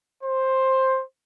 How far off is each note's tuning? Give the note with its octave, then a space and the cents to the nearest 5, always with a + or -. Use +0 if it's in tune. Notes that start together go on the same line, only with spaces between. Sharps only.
C5 +10